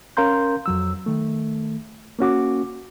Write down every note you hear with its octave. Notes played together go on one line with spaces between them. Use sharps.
C#4 A#4 F5 A#5 C6 G6
F2 F#3 E6
D#3 A3
A#3 C#4 F#4 D6